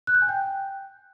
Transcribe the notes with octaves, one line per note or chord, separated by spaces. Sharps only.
F#6
G6
G#5
G5